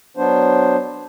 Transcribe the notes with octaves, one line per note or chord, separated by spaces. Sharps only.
F#3 B3 D4 C5